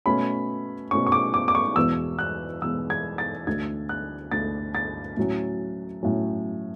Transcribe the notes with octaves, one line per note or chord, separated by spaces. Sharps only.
B2 A3 C#4 B5
B2 A3 C#4 C#6
C#6
D6
D6
D6
C#6
E2 B2 G#3 E6
F#6
E2 B2 G#3 E6
G#6
A6
D2 D3 A3 G#6
F#6
D2 D3 A3 A6
A6
A2 F#3 C#4
A2 F#3 C#4